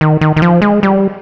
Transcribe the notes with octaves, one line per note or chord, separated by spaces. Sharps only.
D#3
D#3
D#3
F3
G#3
G3